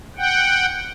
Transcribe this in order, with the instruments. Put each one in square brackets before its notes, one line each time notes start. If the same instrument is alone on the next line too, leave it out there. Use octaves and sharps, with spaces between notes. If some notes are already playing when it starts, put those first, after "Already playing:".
[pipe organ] F#5 G5